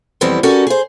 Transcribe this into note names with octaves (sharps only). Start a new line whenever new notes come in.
F2 E3 G3 B3 C4
C#4 F#4 G4 A4 A#4 D5
G#4 C5